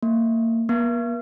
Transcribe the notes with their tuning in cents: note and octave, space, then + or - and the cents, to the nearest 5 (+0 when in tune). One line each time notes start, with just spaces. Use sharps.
A#3 -30
A#3 +40